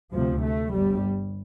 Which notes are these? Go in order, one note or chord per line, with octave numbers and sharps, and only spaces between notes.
D2 C3 F3
A3
G1 G2 G3